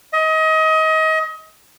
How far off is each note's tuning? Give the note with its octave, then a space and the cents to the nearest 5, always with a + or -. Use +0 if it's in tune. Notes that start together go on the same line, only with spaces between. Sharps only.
D#5 +30